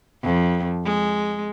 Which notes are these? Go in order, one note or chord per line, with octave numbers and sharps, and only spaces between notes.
F2
G#3